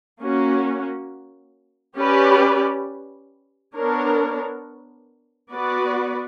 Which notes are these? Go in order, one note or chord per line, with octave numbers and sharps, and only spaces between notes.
A#3 C#4 F#4
C#4 G4 B4 D5
B3 D4 A#4 C#5
B3 F#4 B4 D5